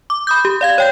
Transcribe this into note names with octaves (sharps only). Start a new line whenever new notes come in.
D6
B5 D#6 G6
G4
D5 F5 G#6
C#5 G5 G6